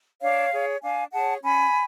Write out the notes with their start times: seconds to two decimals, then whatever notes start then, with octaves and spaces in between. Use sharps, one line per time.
0.22 D4 C#5 F5
0.52 G#4 C#5
0.83 D4 F5 G#5
1.13 G#4 C#5 F#5 A5
1.43 C#4 G#5 B5